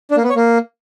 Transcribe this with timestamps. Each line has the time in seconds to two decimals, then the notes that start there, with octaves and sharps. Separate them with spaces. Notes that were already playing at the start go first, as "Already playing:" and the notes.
0.11 D4
0.17 A#3
0.23 B3
0.30 C#5
0.36 A#3